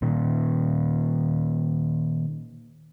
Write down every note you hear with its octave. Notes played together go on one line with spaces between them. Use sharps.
A#2 D#3